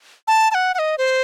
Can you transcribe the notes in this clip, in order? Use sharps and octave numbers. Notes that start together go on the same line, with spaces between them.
A5
A5
F#5
F#5
D#5
C5